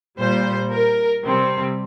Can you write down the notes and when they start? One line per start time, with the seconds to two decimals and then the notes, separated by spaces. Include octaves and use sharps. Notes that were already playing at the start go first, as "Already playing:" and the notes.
0.18 A#2 G3 C5
0.72 A#4
1.24 C3 G3 C4